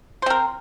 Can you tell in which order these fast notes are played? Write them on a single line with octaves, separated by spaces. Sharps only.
C5 C4 A#4